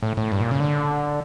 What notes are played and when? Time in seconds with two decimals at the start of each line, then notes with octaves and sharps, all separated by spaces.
0.03 A2
0.17 A2
0.32 G2
0.41 A#2
0.51 C#3
0.60 D3